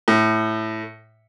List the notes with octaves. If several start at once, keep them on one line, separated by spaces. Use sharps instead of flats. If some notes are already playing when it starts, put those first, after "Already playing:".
A2